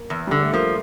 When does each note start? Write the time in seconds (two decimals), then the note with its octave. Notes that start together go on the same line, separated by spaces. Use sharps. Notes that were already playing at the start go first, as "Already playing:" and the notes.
Already playing: A#3
0.10 E2
0.27 D3 G3
0.41 A3
0.53 F3 A#3